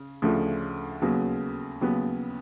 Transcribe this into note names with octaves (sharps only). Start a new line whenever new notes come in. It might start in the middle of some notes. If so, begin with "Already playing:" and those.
Already playing: C#3
D2 C#3 F3 A3
D#2 C#3 F#3 B3
D#2 C#3 F#3 B3